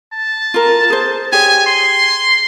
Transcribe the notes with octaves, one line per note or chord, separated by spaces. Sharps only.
A5
F4 A#4
G#4 C5
G4 G#4 C#5 G#5
C6